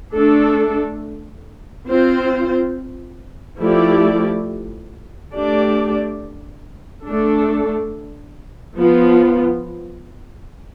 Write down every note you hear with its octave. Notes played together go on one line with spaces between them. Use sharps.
A3 D4 A4
C4 F4 C5
F3 A3 E4 G4 D5
A3 D4 G4 D5
A3 D4 A4
F3 B3 F4